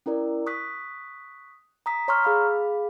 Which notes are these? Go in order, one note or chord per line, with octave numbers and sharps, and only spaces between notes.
C#4 E4 A#4 D5
C#6 D#6 F#6 B6
A#5 D#6 B6
C#5 A#5 C6 C#6 E6 F6
G#4 F5 B5